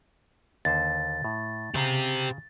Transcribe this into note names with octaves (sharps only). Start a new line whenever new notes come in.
D#2 D3 C5 A6
A2
C#3 G4 C5 A#5